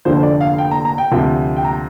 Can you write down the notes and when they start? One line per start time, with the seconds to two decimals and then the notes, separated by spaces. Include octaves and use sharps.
0.05 F1 F2 D3 F3 C5
0.23 D5
0.41 F5
0.58 G5
0.71 A#5
0.85 A#5
0.98 G5
1.11 D2 C3 F3
1.56 G5
1.64 A#5